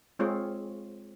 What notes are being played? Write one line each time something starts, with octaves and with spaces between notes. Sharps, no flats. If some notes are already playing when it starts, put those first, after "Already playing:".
G#3 C4 F4 G#4 C#5